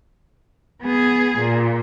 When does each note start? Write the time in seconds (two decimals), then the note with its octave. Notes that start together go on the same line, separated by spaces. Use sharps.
0.82 B3 G#4
1.38 A#2